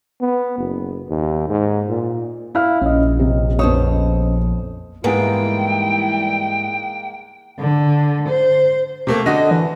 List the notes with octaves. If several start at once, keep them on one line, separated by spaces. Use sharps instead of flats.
B3
F#1
D#2
G#2
A#2
E4 F5 F6
A#1 C#4 D#5
C3
F2 B3 C5 C#5 D#6
G#2 E3 G3 G#3 A#3 B3 E4 G5
D3
C5
C3 A3 A#3
D3 F#4 D#5
E3